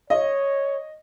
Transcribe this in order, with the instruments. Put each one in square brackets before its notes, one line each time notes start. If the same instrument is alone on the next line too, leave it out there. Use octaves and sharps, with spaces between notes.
[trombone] C#5 [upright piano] D#5